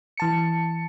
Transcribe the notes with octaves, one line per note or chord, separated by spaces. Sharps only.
E3 A5 C#7